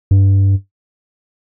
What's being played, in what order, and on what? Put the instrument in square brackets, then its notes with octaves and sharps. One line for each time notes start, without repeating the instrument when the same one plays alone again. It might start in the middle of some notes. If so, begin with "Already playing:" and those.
[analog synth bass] G2